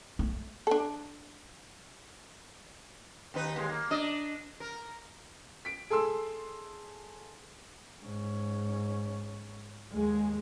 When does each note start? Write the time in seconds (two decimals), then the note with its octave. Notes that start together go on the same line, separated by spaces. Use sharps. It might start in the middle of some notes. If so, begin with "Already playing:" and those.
0.19 A3
0.67 D4 A4
3.34 D#2 D#4 B4
3.56 D#2 G#3
3.69 A#3
3.90 D4 D#5
4.60 A#4
5.65 B6 D7
5.90 G#4 A4 C6 E6
8.00 G#2 C#4
9.93 D#2 G#3